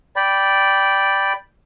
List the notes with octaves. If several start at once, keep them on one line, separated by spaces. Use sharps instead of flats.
D5 G5 B5